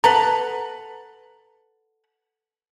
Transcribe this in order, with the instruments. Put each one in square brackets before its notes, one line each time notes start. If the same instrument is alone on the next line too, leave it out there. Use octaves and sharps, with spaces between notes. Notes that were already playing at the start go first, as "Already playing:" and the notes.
[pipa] A4 B4 F#5 [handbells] A#5